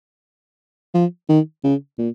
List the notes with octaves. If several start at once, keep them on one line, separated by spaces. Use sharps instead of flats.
F3
D#3
C#3
A#2